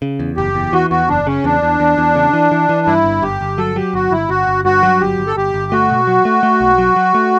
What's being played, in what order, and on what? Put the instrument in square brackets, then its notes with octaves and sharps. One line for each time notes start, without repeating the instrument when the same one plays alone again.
[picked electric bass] C#3
E2
[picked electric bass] F#1 [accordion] G4
[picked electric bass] E2
[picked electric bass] E3 [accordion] F#4
[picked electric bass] E2 [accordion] F#4
[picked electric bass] F#1 [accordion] D4
[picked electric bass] C#3 [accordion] C#4
[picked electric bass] E2 [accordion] D4
[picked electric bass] E2
E2
E2
C#3
E3
E3
E3
[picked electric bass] G2 [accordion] E4
[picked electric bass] G1
[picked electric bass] G1 [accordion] G4
[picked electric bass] G1
[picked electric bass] F#3 [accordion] A4
[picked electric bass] F#3 [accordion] G4
[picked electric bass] G1 [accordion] F#4
[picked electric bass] G1 [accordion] E4
[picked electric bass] G1 [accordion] F#4
[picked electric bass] G1
[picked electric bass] G2 [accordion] F#4
[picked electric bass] F#3
[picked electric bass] G1 [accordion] G4
[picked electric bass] G1
[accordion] A4
[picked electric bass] G1 [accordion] G4
[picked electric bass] G1
[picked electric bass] A3 [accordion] F#4
[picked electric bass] B2
F#3
A3
A3
B1
F#3
F#3
A3